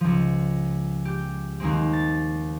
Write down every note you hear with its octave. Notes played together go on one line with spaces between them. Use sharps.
C#2 F3
G4 G6
D#2 G#3 C4
A6